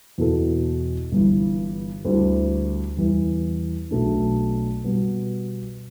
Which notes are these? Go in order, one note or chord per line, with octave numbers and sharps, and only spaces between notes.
E2 B2 B3 E4 A4
G1 G2 E3
D2 D3 G3 E4
E2 E3 G3
B1 B2 A3 D4
B2 G3 B3